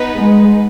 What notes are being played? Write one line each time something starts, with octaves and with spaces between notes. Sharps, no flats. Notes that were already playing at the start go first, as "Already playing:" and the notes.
Already playing: B3 D#4 B4
G#3